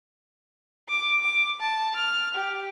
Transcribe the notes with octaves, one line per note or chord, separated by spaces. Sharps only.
D6
D6
A5
F6
G4